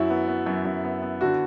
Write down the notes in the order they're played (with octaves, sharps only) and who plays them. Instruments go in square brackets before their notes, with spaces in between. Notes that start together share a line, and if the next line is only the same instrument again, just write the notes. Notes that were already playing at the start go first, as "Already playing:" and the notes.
Already playing: [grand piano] F#2 F#3 [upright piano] E4
[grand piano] B3
B3
F#2
F#2
B3
B3
[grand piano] D3 [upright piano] F#4